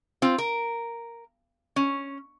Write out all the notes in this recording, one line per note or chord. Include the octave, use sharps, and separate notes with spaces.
C4 F4
A#4
C#4